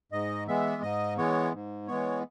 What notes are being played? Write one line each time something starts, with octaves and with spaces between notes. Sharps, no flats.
G#2 D#5
E3 G#3 B3 E5
G#2 D#5
E3 G#3 B3 C#5
G#2
E3 G#3 B3 C#5